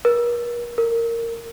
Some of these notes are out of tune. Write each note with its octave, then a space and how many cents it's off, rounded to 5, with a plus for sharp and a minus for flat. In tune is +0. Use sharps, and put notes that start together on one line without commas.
A#4 +40
A#4 -15